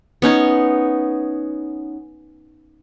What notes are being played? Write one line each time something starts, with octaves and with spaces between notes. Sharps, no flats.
B3 C#4 D#4 C#5